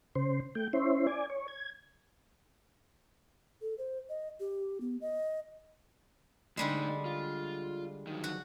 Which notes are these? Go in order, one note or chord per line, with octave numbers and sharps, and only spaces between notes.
C#3 C5
A3 G5
C#4 E4 C5
D5 G#5
C#5
G#6
A4
C5
D#5
G4
B3
D#5
A2 D3 G3 G#3 D#4
F4
D#3 F#3
F#4